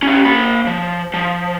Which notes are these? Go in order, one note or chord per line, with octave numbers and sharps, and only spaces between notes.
C#4 G4
A#3 B5
F3
F3